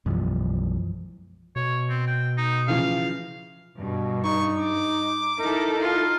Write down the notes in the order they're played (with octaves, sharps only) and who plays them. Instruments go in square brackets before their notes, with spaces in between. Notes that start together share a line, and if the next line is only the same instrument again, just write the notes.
[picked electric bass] B1 B2 G#3 [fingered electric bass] F#2 E3 F3
[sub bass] B2 [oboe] C#5
[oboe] C4
G5
D#4
[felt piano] C#3 E3 F3 [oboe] F5
[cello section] G2 [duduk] B2
[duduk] D#4 [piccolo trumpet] C#6
[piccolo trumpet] D6
[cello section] D#4 E4 A4 [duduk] A#4
[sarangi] F4